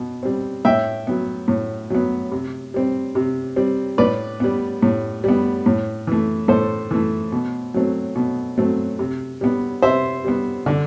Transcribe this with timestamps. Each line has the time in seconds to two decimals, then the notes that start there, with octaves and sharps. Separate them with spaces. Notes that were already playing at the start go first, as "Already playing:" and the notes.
Already playing: B2
0.23 G3 C4
0.65 A2 E5 G5
1.07 F#3 B3
1.48 A2
1.90 F#3 B3
2.31 C3
2.74 G3 C4
3.15 C3
3.56 G3 C4
3.98 A2 B4 D5
4.40 G3 B3
4.83 A2
5.24 G3 B3
5.66 A2
6.07 E3 A3
6.48 A2 A4 C5
6.91 E3 A3
7.32 B2
7.74 F#3 A3 C4
8.16 B2
8.58 F#3 A3 C4
8.99 C3
9.41 G3 B3
9.82 C3 C5 E5
10.25 G3 B3
10.66 D3